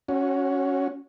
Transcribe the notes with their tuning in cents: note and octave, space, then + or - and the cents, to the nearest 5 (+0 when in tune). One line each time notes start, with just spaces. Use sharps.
C#4 +0 F#4 +0